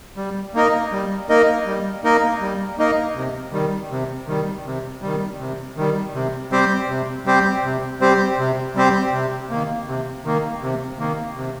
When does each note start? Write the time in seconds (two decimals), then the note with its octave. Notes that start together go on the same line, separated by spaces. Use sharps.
0.17 G3
0.54 A#3 D#4 A#4 D#5
0.92 G3
1.29 A#3 D#4 A#4 D#5
1.66 G3
2.04 A#3 D#4 A#4 D#5
2.41 G3
2.78 A#3 D#4 A#4 D#5
3.16 C3
3.52 D#3 G3
3.91 C3
4.27 D#3 G3
4.65 C3
5.02 D#3 G3
5.39 C3
5.77 D#3 G3
6.14 C3
6.52 G3 C4 G4 C5
6.89 C3
7.26 G3 C4 G4 C5
7.64 C3
8.01 G3 C4 G4 C5
8.38 C3
8.75 G3 C4 G4 C5
9.13 C3
9.50 D#3 A#3
9.88 C3
10.25 D#3 A#3
10.62 C3
10.99 D#3 A#3
11.37 C3